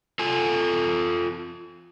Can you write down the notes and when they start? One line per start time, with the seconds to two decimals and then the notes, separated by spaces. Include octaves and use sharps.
0.19 F4 A4 G#5